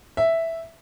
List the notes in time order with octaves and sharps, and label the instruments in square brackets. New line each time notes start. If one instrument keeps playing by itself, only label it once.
[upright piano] E5